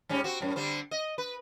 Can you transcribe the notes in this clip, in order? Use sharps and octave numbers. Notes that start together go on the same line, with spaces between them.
G#2 G3 C#4
C4 F#4
F#2 A2
D3 G3 C4
D#5
B4